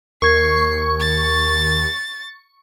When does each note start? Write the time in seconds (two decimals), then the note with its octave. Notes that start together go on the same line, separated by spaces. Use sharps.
0.22 D#2 A#4 C#6 G#6 C7
1.00 A6